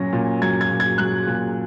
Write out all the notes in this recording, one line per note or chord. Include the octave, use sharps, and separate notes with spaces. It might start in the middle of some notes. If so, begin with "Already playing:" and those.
Already playing: A#2 F#3 C#4 A#6
A#2
F#3 G#6
G#6
A#2
G#6
F#3 F#6
A#2